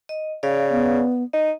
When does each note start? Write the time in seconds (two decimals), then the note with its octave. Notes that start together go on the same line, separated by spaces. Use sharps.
0.09 D#5
0.43 C#3 D5 F5
0.71 B3
1.33 D#4 D#5